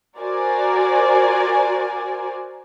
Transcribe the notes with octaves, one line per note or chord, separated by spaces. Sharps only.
F#4 A#4 C5 D5 G#5